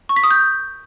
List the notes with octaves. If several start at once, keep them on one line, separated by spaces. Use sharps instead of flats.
C#6
B6
D#6
G6